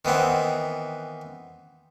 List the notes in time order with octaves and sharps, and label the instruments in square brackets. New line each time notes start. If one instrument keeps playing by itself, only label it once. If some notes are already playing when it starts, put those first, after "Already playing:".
[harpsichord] D#3 E3 B3 C4